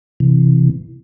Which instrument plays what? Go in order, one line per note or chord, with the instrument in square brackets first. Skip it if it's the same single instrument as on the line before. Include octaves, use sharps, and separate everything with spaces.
[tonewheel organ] C3 E3